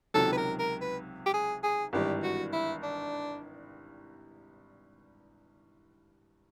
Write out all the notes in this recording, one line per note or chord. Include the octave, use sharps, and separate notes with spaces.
C#2 C3 D#3 F#3 A4
B4
A#4
A#4
B4
G4
G#4
G#4
G#1 G2 E3 G3 G4
F#4
E4
D4